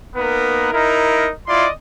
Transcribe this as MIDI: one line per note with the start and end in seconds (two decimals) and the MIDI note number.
0.16 0.70 58
0.16 0.70 59
0.16 0.70 63
0.16 0.70 70
0.16 0.70 71
0.73 1.30 63
0.73 1.30 64
0.73 1.30 70
1.47 1.67 64
1.47 1.67 65
1.47 1.67 74
1.47 1.67 75
1.47 1.67 84